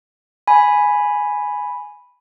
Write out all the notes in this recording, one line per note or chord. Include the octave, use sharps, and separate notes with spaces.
G#5 B5